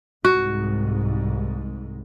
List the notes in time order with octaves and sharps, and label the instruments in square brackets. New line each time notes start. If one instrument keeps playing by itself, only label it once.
[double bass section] C2 G#2 [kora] F#4